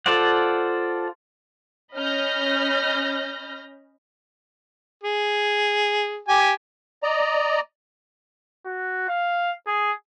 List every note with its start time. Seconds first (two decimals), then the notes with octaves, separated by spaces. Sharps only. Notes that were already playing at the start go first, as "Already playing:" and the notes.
0.06 F4 A4 C5 D5 F#5
1.94 C#4 D#5 B5 F6 G6 A#6
5.03 G#4
6.28 G4 G#5
7.03 D5 D#5 A#5
8.66 F#4
9.09 F5
9.67 G#4